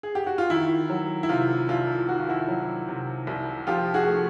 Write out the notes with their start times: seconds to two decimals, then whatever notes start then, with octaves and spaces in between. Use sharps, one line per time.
0.03 G#4
0.15 G4
0.26 F#4
0.38 F4
0.50 D#3 E4
0.90 F#3
1.23 E4
1.29 C3 F4
1.69 C2 F4
2.09 D#3 F#4
2.19 F4
2.29 E4 F#4
2.48 F#3
2.88 C3
3.27 C2
3.67 F3 F4 G4
3.94 F#4 G#4
4.07 A3